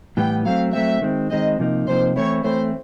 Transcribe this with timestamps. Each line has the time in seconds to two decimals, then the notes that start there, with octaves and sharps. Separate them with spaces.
0.17 A2 E3 G3 B3 G5
0.45 F#3 A3 C4 F5
0.73 F#3 A3 C4 E5
1.02 D#3 G#3 C4
1.30 D#3 G#3 C4 D#5
1.59 C3 F3 A#3 D#4
1.87 C3 F3 A#3 D#4 C5
2.16 E3 A3 C4 E4 C#5
2.44 E3 A3 C4 E4 C5